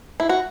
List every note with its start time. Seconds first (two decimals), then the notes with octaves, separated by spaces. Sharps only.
0.20 E4
0.29 F#4